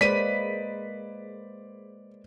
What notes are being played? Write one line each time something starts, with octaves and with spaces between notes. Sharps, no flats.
G#3 A#3 B4 C5 D5 B6 D#7